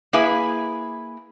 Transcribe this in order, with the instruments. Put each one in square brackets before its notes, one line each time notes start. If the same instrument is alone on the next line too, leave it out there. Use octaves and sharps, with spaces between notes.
[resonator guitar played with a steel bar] A#3 E4 G#4 B4 E5 G#5